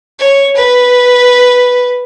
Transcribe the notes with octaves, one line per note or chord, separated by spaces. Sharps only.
C#5
B4